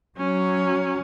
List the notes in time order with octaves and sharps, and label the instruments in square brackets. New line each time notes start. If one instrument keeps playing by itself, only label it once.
[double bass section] F#3 [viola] C#4